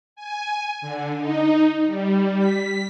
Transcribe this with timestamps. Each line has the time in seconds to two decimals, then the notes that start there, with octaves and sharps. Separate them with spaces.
0.16 G#5
0.81 D3
1.18 D#4
1.86 G3
2.39 B6